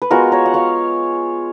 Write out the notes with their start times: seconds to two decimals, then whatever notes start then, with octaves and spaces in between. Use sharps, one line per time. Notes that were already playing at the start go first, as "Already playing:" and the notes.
0.02 B4
0.11 G#3 B3 F4 F#4 A#4
0.32 A#4 C#5
0.46 F#5
0.54 C#5 F5